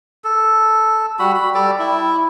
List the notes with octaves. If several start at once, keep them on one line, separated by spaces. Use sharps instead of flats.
A4
G3 F#4 B5
B5
G3 A4 D5
E4